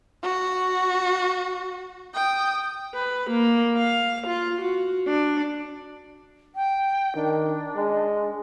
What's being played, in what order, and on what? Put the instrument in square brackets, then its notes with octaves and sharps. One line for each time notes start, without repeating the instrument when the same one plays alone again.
[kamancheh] F#4
G5 D#6
[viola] B4
A#3
F5
F4
F#4
D4
[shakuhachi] G5
[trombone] D#3 [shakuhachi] D4
[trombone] G#3